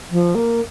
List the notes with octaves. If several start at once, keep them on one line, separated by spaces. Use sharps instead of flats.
F3
A#3